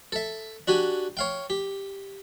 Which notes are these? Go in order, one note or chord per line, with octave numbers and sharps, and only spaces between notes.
A4 E5
D4 F#4 G4 G#5
C#5 F5 G5
G4